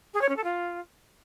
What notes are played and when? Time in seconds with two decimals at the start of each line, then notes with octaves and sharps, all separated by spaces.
0.14 G#4
0.21 C#5
0.29 C#4
0.36 A4
0.44 F4